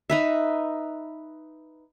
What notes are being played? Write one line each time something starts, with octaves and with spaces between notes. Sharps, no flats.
D#4 B4 E5